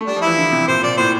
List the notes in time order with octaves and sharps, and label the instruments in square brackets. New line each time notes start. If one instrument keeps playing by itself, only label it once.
[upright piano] A3
[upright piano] G3 [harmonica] D4
[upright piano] F3
[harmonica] E4
[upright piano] E3
D3
C3
[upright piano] A#2 [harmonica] C5
[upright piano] A#2 [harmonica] D5
[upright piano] A2 [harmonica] C5